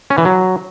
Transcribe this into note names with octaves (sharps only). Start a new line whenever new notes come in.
C#4
E3
F#3